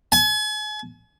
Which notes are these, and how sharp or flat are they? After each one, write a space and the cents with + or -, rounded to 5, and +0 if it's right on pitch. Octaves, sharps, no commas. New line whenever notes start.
G#5 +40